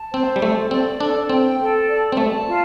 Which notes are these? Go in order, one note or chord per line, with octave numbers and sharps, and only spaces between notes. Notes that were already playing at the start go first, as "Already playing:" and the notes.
Already playing: A5
C4 C5
G3
A3 A4
C4 D5
D4 A4
C4 G5
A4
D5
C4
A3 A5
F4